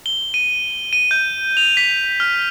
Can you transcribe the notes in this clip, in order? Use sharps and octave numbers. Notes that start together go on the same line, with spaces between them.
G7
D#7
D#7
G6
F7
B6
F6